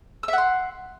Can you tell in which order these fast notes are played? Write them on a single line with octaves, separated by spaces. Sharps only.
E6 E5 F#5 C6